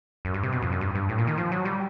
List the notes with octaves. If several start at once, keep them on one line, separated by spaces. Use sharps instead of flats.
F#2
G2
C3
B2
F2
F#2
G2
G2
A2
A#2
D#3
F3
F#3
G3